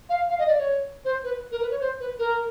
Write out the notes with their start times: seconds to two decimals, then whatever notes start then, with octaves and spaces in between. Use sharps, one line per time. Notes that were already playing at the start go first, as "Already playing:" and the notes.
0.09 F5
0.29 F5
0.38 D#5
0.47 D5
0.58 C#5
1.04 C5
1.23 B4
1.51 A#4
1.61 B4
1.70 C#5
1.80 C5
2.00 B4
2.18 A#4